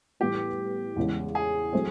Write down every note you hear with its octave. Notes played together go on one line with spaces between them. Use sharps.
A2 E3 G3 B3 G4
E2 C#3 E3 G#3
G#4
F#3 A3 C4